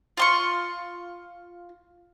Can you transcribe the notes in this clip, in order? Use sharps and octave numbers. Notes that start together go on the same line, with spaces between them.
F4 C6 C#6